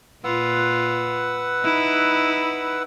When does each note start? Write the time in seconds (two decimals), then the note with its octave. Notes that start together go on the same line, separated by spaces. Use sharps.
0.24 A#2 F4 B4 F#5 E6
1.62 D#4 E4